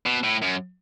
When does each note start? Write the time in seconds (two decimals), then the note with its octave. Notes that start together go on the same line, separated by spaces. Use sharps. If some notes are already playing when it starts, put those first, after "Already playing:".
0.06 B2
0.24 A2
0.42 F#2